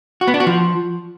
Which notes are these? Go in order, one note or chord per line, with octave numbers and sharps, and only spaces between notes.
F#4
B3
D4
F#4
F3